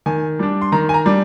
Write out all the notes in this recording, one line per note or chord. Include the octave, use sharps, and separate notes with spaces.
D#3 G#5
G3 D4
C6
D#3 A#5
G#5
A#5
G3 D4